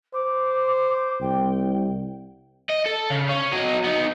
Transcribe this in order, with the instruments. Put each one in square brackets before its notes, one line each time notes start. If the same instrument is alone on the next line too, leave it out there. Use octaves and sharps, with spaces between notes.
[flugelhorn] C5 [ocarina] D6
[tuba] C2 [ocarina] G5
[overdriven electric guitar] D#5
A4
C#3
C#4
F#3 D#5
B3 D#4